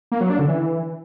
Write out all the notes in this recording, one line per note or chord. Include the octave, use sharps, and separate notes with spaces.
A#3
F#3
D4
D3
E3